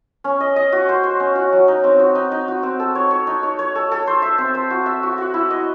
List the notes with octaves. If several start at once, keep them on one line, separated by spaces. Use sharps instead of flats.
C#4
D#5
D#5
F#4
C5
C5
C#4
F#4
F#3
D#4
C4
F#4
D#4
D#4
F#4
C4
A4
C#5
C#5
D#4
C#5
C#5
A4
A4
C5
E5
C4
C5
F#4
E5
F#4
F#4
E4
D#5